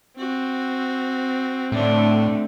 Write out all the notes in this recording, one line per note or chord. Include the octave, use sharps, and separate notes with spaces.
C4 F#4
A2 D3 A3 D4